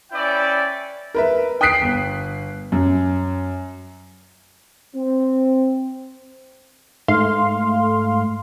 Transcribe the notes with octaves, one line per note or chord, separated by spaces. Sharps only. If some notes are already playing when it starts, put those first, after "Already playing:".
C#4 E4 B4 D5 E5 G5
A#4 B4 E5
G5 D#6 F#6 B6 C7 D7
G1
F#2
C4
G#2 A3 F5 C6